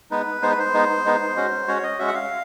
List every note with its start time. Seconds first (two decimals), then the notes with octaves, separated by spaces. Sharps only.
0.11 G#3 B3 D#4 B4
0.42 G#3 B3 D#4 C5
0.51 B4
0.60 C5
0.74 G#3 B3 D#4
1.05 G#3 B3 D#4
1.36 G#3 C#4 F#4
1.67 G#3 C#4 F#4 C#5
1.83 D#5
1.99 G#3 C#4 F#4 E5
2.08 F#5
2.14 F5